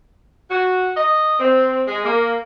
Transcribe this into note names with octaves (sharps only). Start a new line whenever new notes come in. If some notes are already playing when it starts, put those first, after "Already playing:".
F#4
D#5
C4
G#3
A#3